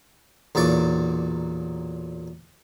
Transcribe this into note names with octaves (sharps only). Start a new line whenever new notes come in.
B1 E2 A#2 D5 C#6